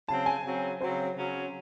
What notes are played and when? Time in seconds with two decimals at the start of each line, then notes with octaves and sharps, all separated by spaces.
0.08 C#3 F#3 C4 A5
0.26 G#5
0.45 C#3 F#3 C4
0.80 C#3 F#3 C4 C5
1.16 C#3 F#3 C#4